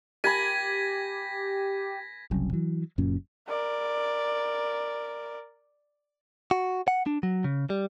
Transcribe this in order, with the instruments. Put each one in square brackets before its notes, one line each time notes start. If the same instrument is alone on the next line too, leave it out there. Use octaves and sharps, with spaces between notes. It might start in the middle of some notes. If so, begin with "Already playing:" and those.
[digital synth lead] G4 [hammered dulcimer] G#5 B5 [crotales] G#6 A#6 B6
[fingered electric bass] F#1 C2 F#2
E3 F#3
F#1 F#2 A#2 C#4
[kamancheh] A#4 D5
[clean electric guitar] F#4
F#5
D4
F#3
C#3
G3